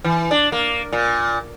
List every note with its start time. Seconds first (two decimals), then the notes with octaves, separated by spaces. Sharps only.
0.04 E3
0.31 D4
0.52 A#3
0.93 A#2